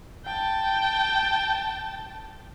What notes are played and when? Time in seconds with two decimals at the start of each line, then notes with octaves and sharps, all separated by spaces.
0.25 G5 A5